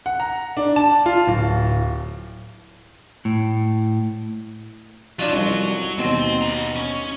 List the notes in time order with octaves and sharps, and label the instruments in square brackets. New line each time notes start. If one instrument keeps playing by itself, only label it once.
[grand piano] F#5
A#5
D4
A5
F4
D1
[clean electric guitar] A2
[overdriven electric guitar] F#3 [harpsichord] D4 D#4 F4
[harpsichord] C2 F2
[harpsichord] D#2 B2 [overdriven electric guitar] C4
[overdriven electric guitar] B3 A#5
C#4